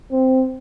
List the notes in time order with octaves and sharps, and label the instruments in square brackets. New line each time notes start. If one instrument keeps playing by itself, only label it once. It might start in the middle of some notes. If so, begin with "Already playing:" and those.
[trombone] C4